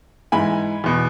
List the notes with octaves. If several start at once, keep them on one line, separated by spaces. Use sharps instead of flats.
G#2 E3 G#5 B5
E2 B2